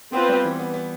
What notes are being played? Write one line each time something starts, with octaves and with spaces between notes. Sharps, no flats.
B3 C4 F4 B4
G3
E3
B3
B3